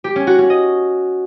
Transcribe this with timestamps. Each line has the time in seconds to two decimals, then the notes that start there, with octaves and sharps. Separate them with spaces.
0.04 G4
0.16 C#4
0.27 F#4
0.38 C#4
0.50 D#5